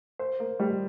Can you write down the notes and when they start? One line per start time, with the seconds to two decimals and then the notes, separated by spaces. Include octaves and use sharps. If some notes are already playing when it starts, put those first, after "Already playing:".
0.19 C5
0.40 A#3
0.59 G3